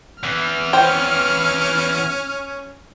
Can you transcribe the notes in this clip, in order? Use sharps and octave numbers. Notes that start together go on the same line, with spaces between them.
E2 E3 F6
C#4 C5 G5